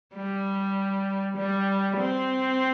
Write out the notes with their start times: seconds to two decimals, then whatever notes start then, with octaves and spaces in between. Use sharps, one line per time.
0.15 G3
1.37 G3
1.98 C4